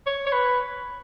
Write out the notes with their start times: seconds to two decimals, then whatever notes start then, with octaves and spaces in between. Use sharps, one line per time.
0.06 C#5
0.27 C#5
0.32 B4